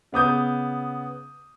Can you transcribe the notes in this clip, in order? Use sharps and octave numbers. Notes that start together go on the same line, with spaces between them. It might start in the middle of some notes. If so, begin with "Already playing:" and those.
C#3 B3 D#6 G6